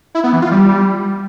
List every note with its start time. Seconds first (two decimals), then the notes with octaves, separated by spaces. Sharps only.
0.15 E4
0.24 B3
0.33 E3
0.42 F4
0.51 G3